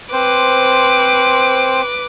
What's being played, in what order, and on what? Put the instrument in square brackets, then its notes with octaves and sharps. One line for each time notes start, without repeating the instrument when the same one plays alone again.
[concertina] C4 C5 [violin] B4 D6